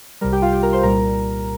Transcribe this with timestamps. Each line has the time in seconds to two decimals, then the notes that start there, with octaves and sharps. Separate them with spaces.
0.21 C2 C3 G3 A#4 A#5
0.32 G4 G5
0.42 F4 F5
0.52 G4 G5
0.63 A#4 A#5
0.73 C5 C6
0.83 C2 A#2 G3 A#4 A#5